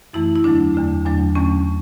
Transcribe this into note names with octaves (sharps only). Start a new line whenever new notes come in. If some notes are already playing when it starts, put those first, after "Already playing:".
F#2 E3 A3 E4
E4
E2 D3 F#3 A3 D4
E2 D3 F#3 A3
E2 D3 F#3 A3 D4
E2 D3 F#3 A3 C#4